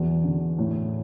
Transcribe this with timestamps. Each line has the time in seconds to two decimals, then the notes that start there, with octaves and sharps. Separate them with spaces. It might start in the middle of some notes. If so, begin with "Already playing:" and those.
Already playing: E2 E3 F#4
0.24 D3
0.58 A2